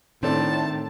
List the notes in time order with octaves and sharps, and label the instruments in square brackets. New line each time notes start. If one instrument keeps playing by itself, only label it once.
[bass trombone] A2 [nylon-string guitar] D#3 [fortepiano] C4 D4 A4 [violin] A5